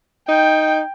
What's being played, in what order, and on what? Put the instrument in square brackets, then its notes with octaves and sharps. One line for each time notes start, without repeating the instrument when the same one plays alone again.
[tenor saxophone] D#4 [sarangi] G5